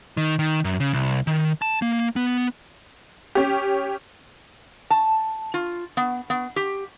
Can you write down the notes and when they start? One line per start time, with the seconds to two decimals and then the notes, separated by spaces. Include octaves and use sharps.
0.17 D#3
0.39 D#3
0.64 F#2
0.80 C#3
0.93 C2
1.27 D#3
1.62 A5
1.82 A#3
2.16 B3
3.35 C#4 G4
4.90 A5
5.54 F4
5.97 B3
6.30 B3
6.56 G4